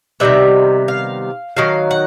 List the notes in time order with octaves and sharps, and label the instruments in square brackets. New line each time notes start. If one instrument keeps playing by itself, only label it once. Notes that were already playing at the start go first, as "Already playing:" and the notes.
[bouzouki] C3 D#3 G3 B3 E5
F5
D#3 F#3 F5
F#5